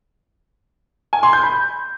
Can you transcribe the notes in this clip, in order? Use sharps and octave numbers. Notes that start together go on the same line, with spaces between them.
G#5
C6
G6
B5